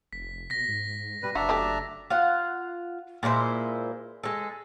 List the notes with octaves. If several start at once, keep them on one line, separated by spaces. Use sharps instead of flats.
F1 B6
B2 A#6 B6
G#2
B2 G3 B4
F#1 D4 F#4 E5 A#5
F#3 A3 G4
F4 F5 F#5
A#2 G#3 E4 C5
G#3 A4